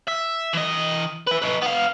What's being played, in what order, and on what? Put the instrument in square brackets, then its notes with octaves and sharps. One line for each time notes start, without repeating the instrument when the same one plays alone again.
[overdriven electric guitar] E5
E3 D#5
B4 E5
D#4 B4
B3 F5